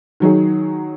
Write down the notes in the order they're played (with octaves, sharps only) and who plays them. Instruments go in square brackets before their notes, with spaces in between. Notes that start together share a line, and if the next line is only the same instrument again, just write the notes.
[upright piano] D#3 F#3 D#4 G#4